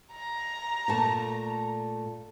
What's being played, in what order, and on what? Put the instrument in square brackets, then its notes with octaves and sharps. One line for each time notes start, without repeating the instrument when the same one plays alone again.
[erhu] A#5
[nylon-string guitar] A#2 A3 A5